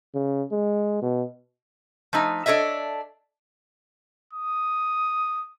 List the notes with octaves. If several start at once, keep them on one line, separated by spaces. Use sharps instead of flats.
C#3
G#3
B2
F3 A3 D#4
D4 A4 C#5 D#5 E5
D#6